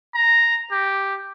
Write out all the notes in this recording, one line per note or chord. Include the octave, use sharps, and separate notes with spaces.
A#5
G4